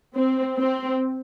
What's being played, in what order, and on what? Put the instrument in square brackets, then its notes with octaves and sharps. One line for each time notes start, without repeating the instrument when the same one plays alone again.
[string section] C4
C4